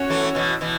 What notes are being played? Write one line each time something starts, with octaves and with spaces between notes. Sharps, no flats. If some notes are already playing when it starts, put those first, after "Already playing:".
Already playing: C#4 F#4 C#5
E3 A3
B2 E3
B2 E3